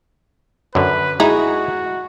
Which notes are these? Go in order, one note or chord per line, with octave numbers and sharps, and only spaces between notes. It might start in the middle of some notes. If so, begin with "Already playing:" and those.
F#2 D3 B4
G#3 D#4 E4 F#4